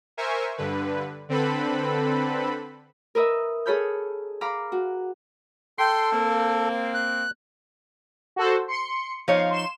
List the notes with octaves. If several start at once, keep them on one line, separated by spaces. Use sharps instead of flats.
A#4 C5 E5 G#5 C#6
G2 D3 B4
D3 C4 A4 B4 B5
A#4 B4 D#5 E5
G#4 A4 C#5 B5 F6 G6
F5 A#5 B5 D6 F6
F#4
A4 G5 C6
A#3 C4
F#6
F#4 A4 C5
C6 C#7
F3 D#4 C#5 F5
C6 E7